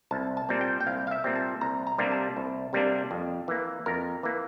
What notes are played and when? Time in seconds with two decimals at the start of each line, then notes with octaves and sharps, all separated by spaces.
0.11 C2 A5
0.37 A5
0.49 A#2 G3 C4
0.61 G5
0.80 G5
0.87 C2 F5
1.07 F5
1.11 E5
1.24 A#2 G3 C4
1.36 A5
1.61 C2 A#5
1.87 A#5
1.98 C3 G3 A#3 D4
2.12 A5
2.37 C2
2.73 C3 G3 A#3 D4
3.11 F2
3.48 E3 A#3
3.86 F2 A#4
4.23 E3 A#3